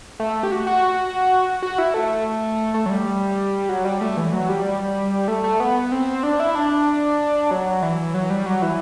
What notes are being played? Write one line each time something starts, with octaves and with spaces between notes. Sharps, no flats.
A3
G4
F#4
F#4
F#4
E4
A3
A3
F#3
G3
F#3
G3
A3
E3
F#3
G3
A3
A3
B3
C4
D4
E4
D4
F#3
E3
F#3
G3
F#3
E3